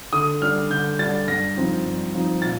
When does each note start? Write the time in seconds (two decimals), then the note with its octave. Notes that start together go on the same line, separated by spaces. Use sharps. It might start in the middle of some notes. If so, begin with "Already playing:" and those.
0.13 D3 D#6
0.41 G3 D4 F6
0.70 D3 G6
0.99 G3 D4 A6
1.28 G2 A#6
1.56 F3 C4 D#4
1.85 G2
2.14 F3 C4 D#4
2.42 A#2 A6